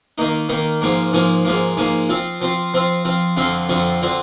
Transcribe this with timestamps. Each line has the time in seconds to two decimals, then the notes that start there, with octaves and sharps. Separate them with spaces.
0.18 D#3 A#3 D#4
0.49 D#3 A#3 D#4
0.82 G#2 F3 A#3
1.13 G#2 F3 A#3
1.45 G#2 F3 A#3
1.77 G#2 F3 A#3
2.09 F3 C4 F4
2.41 F3 C4 F4
2.74 F3 C4 F4
3.05 F3 C4 F4
3.37 F2 D3 F3 C4 F4
3.69 F2 D3 F3 C4 F4
4.02 D3 F3 C4 F4